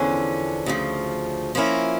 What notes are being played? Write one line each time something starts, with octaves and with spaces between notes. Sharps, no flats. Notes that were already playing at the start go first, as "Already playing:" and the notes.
Already playing: E2 D3 F3 C#4
D2 C#3 F3
F3 A#3 C#4 E4 A#4